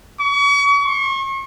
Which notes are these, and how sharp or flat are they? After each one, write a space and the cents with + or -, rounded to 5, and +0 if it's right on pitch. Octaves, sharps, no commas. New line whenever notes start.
C#6 +40
C#6 -40